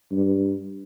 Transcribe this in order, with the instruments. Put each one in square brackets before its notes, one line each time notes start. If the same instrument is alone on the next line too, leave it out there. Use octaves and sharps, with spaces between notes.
[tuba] G2